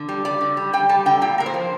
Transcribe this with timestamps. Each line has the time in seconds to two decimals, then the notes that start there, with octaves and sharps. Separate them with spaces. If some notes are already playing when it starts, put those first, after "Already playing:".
Already playing: D3
0.09 G3
0.25 G3 D5
0.41 D3
0.57 G3
0.73 G3 G5
0.89 G3 A5
1.06 D3 G5
1.21 A#2 G5
1.38 A#2 A#4
1.46 C5
1.54 F3